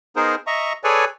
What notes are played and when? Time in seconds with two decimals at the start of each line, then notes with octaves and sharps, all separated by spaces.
0.16 B3 D#4 G#4 A#4 C5
0.47 D#5 E5 A#5 C#6
0.84 G#4 A4 B4 C#5 D5 G#5